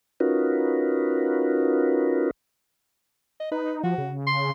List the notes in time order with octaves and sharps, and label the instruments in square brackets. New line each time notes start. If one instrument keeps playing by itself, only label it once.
[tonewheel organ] C#4 D#4 F4 F#4 A#4 B4
[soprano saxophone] D#5
[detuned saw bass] D#4 [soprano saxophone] B4
[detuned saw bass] F3 [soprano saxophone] F#4
[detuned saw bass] C#3
[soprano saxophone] C6